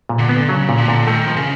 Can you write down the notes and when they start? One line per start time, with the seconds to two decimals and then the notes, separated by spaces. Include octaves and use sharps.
0.09 A#2
0.19 D3
0.29 B3
0.48 C#3 F#3
0.69 A#2
0.78 D3
0.88 A#2
1.07 D#3 A3
1.27 F3
1.36 C#3